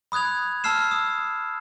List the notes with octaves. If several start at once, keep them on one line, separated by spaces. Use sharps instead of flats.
B5 D#6 F#6 G#6 F7
A5 E6 F6 C7 E7
D#6